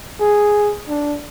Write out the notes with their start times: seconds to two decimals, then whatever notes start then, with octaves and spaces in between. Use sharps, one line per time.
0.21 G#4
0.89 D4